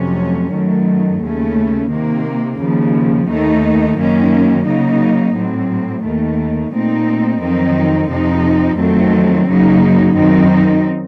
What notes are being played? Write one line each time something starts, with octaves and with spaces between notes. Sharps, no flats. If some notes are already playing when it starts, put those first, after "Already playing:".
Already playing: F2 C3 F#3 A3 C#4
F#2 D#3 F#3 A3
D#2 C#3 A3 C#4
C3 D#3 A#3
D#2 C#3 F3
D#2 D#3 A3 D#4
F#2 D#3 A#3 C#4
C#3 F#3 A#3 D#4
A2 F#3 C4
D#2 D#3 A3
A#2 A3 C4 D#4
F2 D#3 F#3 C4 D#4
F2 C3 F3 C4 D#4
F2 D#3 F#3 A3 C4
F#2 C#3 F#3 A#3 D#4
F#2 D#3 F#3 C4 D#4